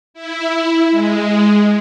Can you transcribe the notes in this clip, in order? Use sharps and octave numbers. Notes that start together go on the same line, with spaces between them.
E4
G#3